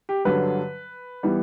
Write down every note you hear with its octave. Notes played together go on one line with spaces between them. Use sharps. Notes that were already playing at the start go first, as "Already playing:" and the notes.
G4
G2 D3 F#3 B4
E3 G3 B3